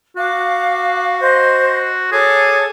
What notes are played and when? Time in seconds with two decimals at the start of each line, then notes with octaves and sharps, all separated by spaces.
0.17 F#4 F5 D6
1.21 C5 D#5 G6
2.12 G#4 A4 C#5 D6